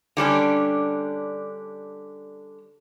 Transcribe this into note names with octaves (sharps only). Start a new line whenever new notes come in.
D3 G3 C#4 D4